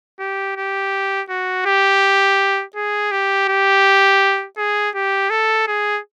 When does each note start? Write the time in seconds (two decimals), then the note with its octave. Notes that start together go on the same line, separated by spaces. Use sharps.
0.20 G4
0.57 G4
1.29 F#4
1.66 G4
2.76 G#4
3.11 G4
3.48 G4
4.57 G#4
4.95 G4
5.30 A4
5.67 G#4